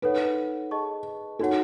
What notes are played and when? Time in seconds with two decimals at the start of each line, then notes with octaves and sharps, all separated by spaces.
0.02 D#4 A4 B4 C#5 F#5
0.71 G#4 D#5 A5 C#6
1.39 D#4 F#4 A4 C#5 F#5